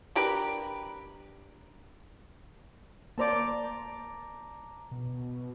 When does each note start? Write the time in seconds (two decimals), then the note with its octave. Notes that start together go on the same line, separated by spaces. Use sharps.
0.15 D4 G4 A#4 B4
3.18 A#3 C5 D5 A5 A#5 D6
4.91 B2